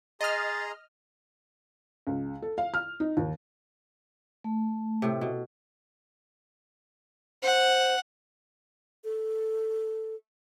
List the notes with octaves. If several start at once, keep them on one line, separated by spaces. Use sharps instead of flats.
G#4 D#5 A#5 C6 F6 A6
C#2
A4
F5
F6
D#4
D#2
A3
A2 C3
B2
C5 F#5
A4